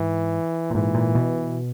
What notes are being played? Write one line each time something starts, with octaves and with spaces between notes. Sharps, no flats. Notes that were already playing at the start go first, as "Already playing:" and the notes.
Already playing: G#2 E3
A#2
G#2 E3
A#2
B2